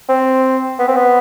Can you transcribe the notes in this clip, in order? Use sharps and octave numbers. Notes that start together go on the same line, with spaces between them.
C4
B3
C4
B3